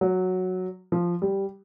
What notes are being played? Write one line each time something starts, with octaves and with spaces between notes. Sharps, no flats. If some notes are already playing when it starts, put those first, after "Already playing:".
F#3
F3
G3